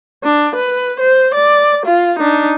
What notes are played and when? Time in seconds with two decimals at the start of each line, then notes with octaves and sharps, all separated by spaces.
0.23 D4
0.55 B4
1.00 C5
1.34 D5
1.86 F4
2.19 D4 D#4